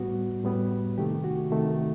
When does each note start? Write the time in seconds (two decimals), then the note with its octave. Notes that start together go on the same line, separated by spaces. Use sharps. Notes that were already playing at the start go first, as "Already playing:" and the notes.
Already playing: A2 G3 B3 F#4
0.44 A2 G3 B3
0.98 C3 D#3 A3 G4
1.24 F#4
1.51 C3 D#3 A3